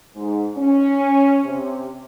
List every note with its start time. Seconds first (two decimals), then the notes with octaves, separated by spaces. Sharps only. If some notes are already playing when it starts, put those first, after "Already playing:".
0.15 G#2
0.56 C#4
1.44 C3